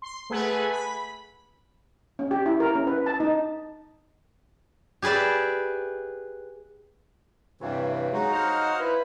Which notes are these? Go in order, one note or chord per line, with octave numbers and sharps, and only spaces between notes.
C6
A3 G#4 B4 F#5 G#5
B5
C#4
G4
E4
A#4
C#4
B4
A5
D#4
G4 G#4 B4 D5 E5
G2 C3 E3 C#5 F5 A5
F#3 G#3 D#4 F#4
C5 D#5 F#5 F6
E4 B4